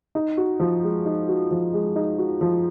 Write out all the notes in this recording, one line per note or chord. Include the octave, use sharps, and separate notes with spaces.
D#4
F#4
F3
G#3
D#4
F#4
F3
G#3
D#4
F#4
F3